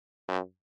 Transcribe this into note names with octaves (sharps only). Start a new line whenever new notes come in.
F#2